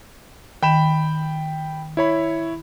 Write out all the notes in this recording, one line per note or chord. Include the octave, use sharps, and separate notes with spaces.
D#3 G5 B5 E7
E4 C#5 B5